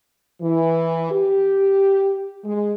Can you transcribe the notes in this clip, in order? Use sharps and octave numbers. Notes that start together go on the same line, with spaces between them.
E3
G4
G#3